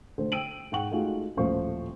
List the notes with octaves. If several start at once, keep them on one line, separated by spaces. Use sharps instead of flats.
D3 A3 C5
G5 E6 D7 D#7 F#7
G#2 G#3 F#5 G5 C#6 F#7
G#3 A3 D#4 F4 F#4 G#4
D#1 A1 F3 A3 C5 C#6